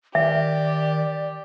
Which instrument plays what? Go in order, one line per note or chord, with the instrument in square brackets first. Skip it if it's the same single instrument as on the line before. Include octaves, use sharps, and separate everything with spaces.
[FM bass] D#3 [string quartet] G4 [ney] D5 [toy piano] E5